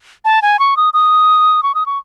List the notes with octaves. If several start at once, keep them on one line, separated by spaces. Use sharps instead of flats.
A5
G#5
C#6
D#6
D#6
C#6
D#6
C#6